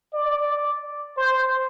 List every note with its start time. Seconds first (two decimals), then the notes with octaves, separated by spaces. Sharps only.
0.14 D5
1.17 C5